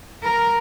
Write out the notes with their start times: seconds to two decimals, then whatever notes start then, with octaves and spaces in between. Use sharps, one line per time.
0.23 A#4